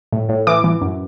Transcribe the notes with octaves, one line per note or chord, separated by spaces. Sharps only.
A2
A2
E3 D6
E3
F#2